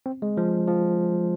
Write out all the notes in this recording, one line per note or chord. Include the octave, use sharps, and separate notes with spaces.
C4
G#3
F3
F3